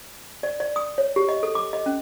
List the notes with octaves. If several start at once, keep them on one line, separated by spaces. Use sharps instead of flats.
D5
D5
D#6
C#5
G4
D#5
A4
D6
D#5
C#4